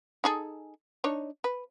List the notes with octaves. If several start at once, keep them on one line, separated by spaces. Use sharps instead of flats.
D#4 G#4 A4
D4 D#4 C#5
B4